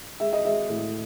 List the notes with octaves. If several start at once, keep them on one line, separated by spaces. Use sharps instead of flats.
G#3 E5
D#5
G#3 E5
A2